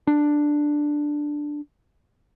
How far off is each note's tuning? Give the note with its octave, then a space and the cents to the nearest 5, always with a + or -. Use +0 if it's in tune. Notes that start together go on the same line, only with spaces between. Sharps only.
D4 +5